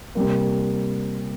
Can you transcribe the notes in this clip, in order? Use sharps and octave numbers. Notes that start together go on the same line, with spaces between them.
C3 G3 A#3